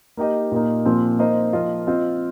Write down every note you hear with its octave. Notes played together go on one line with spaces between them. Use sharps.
A#3 D#4 G4 D#5
A#2 A#3 D#4
A#2 F3 C4
A#3 D#4 C5 D#5
F3 A#3 F4 D#5
C4 F4 D#5